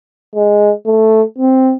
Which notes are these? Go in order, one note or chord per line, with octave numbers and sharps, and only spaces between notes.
G#3
A3
C4